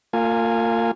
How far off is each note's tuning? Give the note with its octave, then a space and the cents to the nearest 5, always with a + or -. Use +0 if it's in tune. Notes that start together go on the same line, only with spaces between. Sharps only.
A#3 -35 F4 +0 G#5 +0